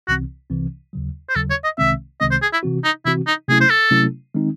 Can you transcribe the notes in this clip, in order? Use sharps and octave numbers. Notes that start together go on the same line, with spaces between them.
C2 C3 E3 C4 F#4
C2 C3 E3 C4
D#2 C#3 F#3
C5
D#2 C#3 F#3 A4
C#5
D#5
C2 C3 D#3 G#3 C4 E5
C2 C3 D#3 G#3 C4 D#5
C5
G#4
E4
C3 E3 C4 F#4
D#4
C3 E3 C4 E4 F#4
D#4
C3 F#3 A3 C#4 E4 G#4
C5
A4
C3 F#3 A3 C#4 E4
D#3 G#3 C4 D#4